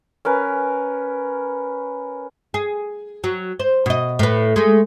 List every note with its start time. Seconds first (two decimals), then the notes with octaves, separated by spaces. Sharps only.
0.25 C#4 A#4 B4
2.54 G#4
3.24 F#3
3.60 C5
3.86 B2 D#5
4.19 A2 B4
4.56 G#3 A3